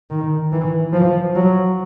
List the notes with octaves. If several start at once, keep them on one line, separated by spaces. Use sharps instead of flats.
D#3
E3
F3
F#3